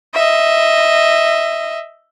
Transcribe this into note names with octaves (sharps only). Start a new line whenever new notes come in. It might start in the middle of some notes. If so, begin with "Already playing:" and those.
D#5 E5